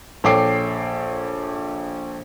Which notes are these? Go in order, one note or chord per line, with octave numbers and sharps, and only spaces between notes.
A#1 A4 C#5 G5 D6 C7